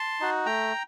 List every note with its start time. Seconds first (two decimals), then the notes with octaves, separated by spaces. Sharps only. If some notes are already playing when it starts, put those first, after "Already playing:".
Already playing: A5 C6
0.20 D#4 F#4
0.46 A3 G5 A#5